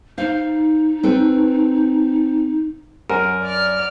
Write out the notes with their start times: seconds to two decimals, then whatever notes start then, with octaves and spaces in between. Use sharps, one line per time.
0.18 D#4 C5 F5
1.03 C4 A4 B4
3.10 F#2 A#4
3.43 D5 F6